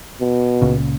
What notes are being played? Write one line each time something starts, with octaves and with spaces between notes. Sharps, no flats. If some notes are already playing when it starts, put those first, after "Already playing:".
B2
C#2 A#2 C#3